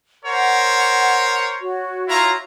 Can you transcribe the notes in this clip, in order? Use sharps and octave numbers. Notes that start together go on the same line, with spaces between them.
A#4 C5 C#5 F#5
F#4 C#5
E4 F4 A#5